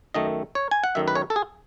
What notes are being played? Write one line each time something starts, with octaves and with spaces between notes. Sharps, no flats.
F#2 D#3 A3 D#5
C#5
G#5
F#5
F#2 D#3 A3 E5
B4
C#5
A4
G#4